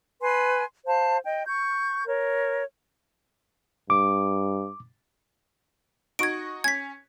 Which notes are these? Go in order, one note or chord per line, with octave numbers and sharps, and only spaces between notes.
B4 G#5 C6
C5 F5 A5
D#5 G5
C#6 G6
A#4 C#5
G2 D6
D#4 F#4 C#6 G#6 D7
C#4 G#6 B6